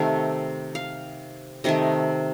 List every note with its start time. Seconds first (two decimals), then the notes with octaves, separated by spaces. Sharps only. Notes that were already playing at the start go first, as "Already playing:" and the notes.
Already playing: C3 D#3 A3 F5
0.75 F5
1.64 C3 D#3 A3 D#5